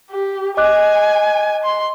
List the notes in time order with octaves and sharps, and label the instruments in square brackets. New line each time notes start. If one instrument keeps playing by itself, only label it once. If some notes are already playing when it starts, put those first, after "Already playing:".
[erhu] G4
[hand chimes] D#5 D6 F#6 [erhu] G#5
[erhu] C6